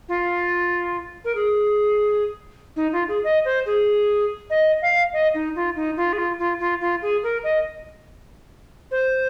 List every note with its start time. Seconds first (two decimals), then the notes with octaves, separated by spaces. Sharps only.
0.08 F4
1.25 A#4
1.35 G#4
2.76 D#4
2.92 F4
3.08 G#4
3.24 D#5
3.45 C5
3.66 G#4
4.50 D#5
4.82 F5
5.13 D#5
5.34 D#4
5.55 F4
5.76 D#4
5.96 F4
6.13 G#4
6.18 F4
6.39 F4
6.60 F4
6.81 F4
7.02 G#4
7.23 A#4
7.44 D#5
8.91 C5